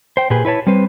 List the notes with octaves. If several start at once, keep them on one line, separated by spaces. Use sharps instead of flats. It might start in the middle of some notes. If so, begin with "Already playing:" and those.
C5 G5
A#2 G4 G#4 B4
E4 B4 C#5 A5
G3 C4 B4 C5